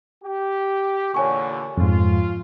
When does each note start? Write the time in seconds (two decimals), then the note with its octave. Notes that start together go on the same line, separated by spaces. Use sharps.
0.24 G4
1.14 E2 A#2 D3 C#5 G#5 C#6
1.77 F2 G#2 F4